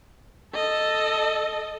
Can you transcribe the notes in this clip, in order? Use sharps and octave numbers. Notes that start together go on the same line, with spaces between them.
A4 D#5